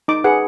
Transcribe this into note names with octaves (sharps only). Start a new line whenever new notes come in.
D#4 D6
G#4 B4 F#5